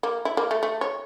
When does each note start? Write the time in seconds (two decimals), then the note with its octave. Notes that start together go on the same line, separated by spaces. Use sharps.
0.03 A#3
0.25 E4
0.37 A#3
0.51 A3
0.63 A3
0.81 C#5